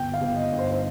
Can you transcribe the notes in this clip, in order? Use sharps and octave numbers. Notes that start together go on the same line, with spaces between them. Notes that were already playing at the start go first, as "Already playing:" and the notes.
Already playing: G1 G5
F5
G1
D#5
G2
C5
C5